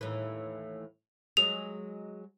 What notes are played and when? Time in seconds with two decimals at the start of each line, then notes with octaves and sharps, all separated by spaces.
0.01 D#2 A2 E3
1.37 F#3 G#3 G#4 F7